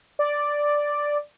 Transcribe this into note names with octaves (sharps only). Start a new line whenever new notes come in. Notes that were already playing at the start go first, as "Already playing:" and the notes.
D5